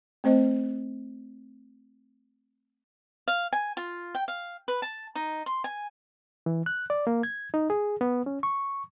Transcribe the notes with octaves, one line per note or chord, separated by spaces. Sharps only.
A3 C4 C5 D#5
F5
G#5
F4
G5
F5
B4
A5
D#4
C6
G#5
E3
F#6
D5
A#3
G#6
D#4
G#4
B3
C#4
C#6